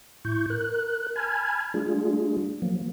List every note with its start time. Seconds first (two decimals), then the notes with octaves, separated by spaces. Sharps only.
0.25 A2 E4 C#6 G6
0.50 A#4 F#6
1.16 G#5 A5 B5 F6 G#6
1.74 G3 A3 D4 F4 G#4
2.62 F3 F#3 A#3